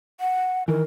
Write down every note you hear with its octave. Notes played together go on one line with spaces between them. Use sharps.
F#5
D#3 E3 A#4